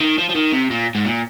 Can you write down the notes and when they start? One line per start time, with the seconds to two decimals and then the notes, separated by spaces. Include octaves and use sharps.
0.01 D#3
0.18 F3
0.29 F3
0.35 D#3
0.52 C3
0.70 A#2
0.95 G#2
1.05 A#2